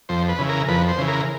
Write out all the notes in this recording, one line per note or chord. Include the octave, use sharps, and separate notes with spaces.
F2 C5
B4
C#3 E3
A#4
F2 B4
C5
C#3 E3
A#4